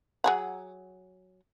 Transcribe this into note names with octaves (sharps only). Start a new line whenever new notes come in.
F#3 G#4 F#5